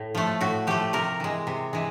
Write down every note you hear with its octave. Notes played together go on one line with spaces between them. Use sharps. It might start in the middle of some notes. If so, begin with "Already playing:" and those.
Already playing: A2
F3 A3
A2 F#4
F3 A3 G4
C3 A#4
E3 G#3
C3
E3 G#3